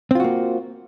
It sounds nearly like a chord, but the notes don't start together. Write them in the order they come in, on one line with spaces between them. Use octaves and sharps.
C4 F4 F#4 A#3